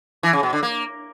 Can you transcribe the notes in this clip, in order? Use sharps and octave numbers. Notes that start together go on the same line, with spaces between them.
E3
C#3
B2
D3
A#3